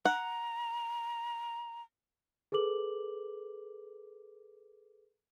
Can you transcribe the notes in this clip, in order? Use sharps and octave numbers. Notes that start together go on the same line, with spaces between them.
F#5 A#5
G#4 A4 B4 D6 F#7